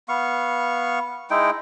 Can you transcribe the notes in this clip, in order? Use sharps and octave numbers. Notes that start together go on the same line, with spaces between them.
B3 F5 C#6
G#3 D#4 E4 G5